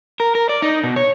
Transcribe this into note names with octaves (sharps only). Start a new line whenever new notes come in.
A#4
A#4
D5
D#4
B2
C#5